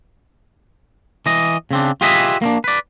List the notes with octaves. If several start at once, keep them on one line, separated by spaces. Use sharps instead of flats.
E3 D#5
C#3 C4 D4
F4 G4 G#4 B4 D#5 E5
A#3 C4 D4
B4 D5